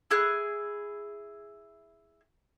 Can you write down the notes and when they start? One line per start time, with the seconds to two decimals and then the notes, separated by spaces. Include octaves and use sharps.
0.11 E4 G#4 F#6